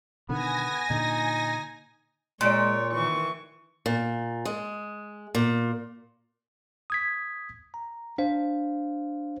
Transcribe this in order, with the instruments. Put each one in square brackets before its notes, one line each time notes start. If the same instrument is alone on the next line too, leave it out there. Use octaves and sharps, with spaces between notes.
[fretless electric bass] B2 D3 D#3 [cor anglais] B3 [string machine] G#5 A#6
[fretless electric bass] A#2 D3 [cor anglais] D#4
[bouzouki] A#2 [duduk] G#3 [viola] C#5 [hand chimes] C6 D7
[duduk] D#3 [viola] E3 C#6
[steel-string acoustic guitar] A#2
G#3
A#2
[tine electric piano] D#6 G#6 B6
A#5
D4 C5 F5